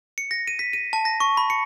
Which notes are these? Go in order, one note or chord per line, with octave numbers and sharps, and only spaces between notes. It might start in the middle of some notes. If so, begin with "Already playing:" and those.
C#7
A#6
D#7
B6
D#7
A5
A#6
C#6
B5
C#7